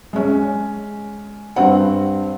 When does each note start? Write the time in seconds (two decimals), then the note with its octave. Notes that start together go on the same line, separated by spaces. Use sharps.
0.13 G#3 C#4
1.56 G2 C4 F#5